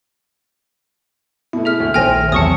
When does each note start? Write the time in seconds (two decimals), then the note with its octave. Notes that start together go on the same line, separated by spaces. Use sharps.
1.53 B2 A3 E4
1.65 G#4 E5 F6
1.80 D2
1.94 A#1 D#3 A3 C5 G5 G#5 F6 A#6
2.32 E2 C3 F#3 A5 C#6 D#6 C#7